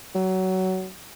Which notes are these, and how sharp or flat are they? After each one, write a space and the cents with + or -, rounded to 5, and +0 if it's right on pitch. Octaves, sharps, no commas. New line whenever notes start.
F#3 +20